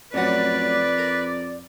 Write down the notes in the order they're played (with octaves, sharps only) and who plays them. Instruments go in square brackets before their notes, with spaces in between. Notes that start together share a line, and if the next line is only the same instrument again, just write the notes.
[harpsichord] A1 F#3 F#5 [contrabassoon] F2 [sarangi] B4 [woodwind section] D5
[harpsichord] A#4